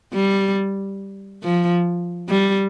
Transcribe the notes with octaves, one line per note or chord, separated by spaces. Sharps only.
G3
F3
G3